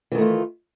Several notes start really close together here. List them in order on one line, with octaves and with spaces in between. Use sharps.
E3 D#3 A3 F4